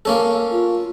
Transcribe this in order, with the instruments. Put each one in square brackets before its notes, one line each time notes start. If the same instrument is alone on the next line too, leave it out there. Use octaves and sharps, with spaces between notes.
[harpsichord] A#3 C#4 A4
[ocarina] F4